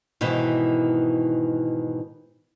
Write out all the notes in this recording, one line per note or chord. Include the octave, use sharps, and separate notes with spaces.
G#2 B2 D#3 E3